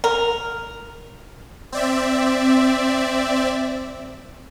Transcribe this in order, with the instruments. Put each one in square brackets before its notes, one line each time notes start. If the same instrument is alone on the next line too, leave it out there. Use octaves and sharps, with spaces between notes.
[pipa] A#4
[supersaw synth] C4 D5 E5